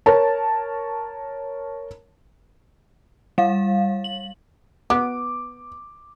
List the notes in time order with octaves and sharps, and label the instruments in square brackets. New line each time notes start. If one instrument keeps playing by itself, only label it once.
[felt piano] A#4 C#5 A5
[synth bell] G3 F5
F#7
[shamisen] B3 [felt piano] D6